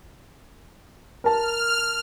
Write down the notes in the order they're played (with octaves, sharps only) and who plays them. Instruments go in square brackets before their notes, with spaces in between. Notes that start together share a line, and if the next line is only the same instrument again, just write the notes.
[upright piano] A#4 A5 [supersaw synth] F6